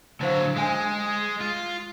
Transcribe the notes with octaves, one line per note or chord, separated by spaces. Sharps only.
D3 F#3 E4 C5 F5
G#3 D4 G#5 D#6
F4